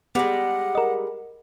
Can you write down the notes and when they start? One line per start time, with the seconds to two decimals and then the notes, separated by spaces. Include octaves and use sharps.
0.15 G3 G#3 B3 F#5
0.75 A#4 D#5